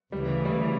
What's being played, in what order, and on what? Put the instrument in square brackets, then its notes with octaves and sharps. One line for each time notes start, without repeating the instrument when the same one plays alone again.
[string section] D2 C#3 E3 [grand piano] G3
[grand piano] G3